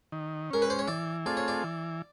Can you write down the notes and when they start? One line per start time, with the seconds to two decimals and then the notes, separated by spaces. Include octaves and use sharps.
0.12 D#3
0.51 G#3 C#4 A#4
0.62 B4
0.70 C5
0.79 C#5
0.88 E3 D5
1.26 A3 C4 F4 G#4 D5
1.37 C#5
1.48 D5
1.64 E3